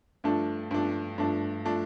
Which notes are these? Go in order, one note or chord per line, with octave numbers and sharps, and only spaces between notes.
G2 F3 A3 D4
G2 F3 A3 D4
G2 F3 A3 D4
F3 A3 D4